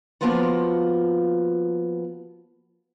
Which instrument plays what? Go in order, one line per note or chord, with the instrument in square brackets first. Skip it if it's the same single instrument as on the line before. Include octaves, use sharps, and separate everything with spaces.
[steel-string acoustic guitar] F3 G3 A#3 B3 F4 F#4